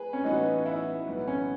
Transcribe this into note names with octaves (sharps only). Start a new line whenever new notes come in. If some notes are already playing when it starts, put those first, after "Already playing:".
Already playing: G#4 B4
C#4
A1 A2 E3 B3 D#4 F#4
E4
B1 A2 E3 B3
C#4